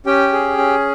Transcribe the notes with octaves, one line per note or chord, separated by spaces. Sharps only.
C#4 G4 G5
G#4
C#4